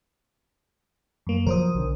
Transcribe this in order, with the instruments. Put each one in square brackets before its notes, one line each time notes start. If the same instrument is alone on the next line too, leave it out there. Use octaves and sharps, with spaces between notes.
[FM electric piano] F#2 A#3
[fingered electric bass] C#3 F3 F#3 [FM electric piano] A#4 C5 D#6
[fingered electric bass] B1 D3